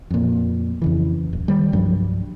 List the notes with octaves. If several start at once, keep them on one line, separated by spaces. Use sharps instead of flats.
F2 A#2
F2 C#3 E3
D1
D#3 G3
C2 G2 F3 F#3